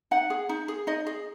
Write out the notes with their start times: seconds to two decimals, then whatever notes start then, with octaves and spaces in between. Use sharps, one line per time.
0.11 D#4 F#5
0.30 G#4
0.49 D#4
0.68 G#4
0.87 D#4 D#5
1.06 G#4